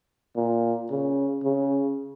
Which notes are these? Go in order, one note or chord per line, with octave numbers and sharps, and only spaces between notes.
A#2
C#3
C#3